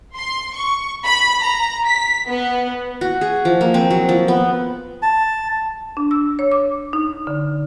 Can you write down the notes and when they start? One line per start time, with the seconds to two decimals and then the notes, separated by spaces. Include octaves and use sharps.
0.16 C6
0.54 C#6
1.04 B5
1.41 A#5
1.86 B6
2.28 B3
3.01 F#4
3.21 G#4
3.45 F3
3.61 A#3
3.74 C4
3.91 F#3
4.09 F3
4.28 B3
5.02 A5
5.97 D4
6.11 E6
6.39 C#5
6.51 D6
6.93 D#4
7.27 D3